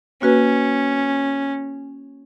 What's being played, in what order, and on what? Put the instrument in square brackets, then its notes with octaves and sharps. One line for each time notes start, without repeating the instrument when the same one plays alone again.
[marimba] A#3 F#4 B4 [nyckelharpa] C#4